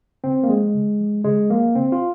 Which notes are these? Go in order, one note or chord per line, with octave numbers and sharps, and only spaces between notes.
C#3 C4
A#3
F3 G#3
C#3
F3
C#3 G#3
F3 A#3
C#3 C4
F4